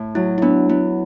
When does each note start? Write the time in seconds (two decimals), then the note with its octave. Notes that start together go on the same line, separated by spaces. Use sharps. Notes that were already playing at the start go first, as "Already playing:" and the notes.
Already playing: A2
0.15 F#3 E4
0.38 E4
0.42 B3 D4
0.69 B3 E4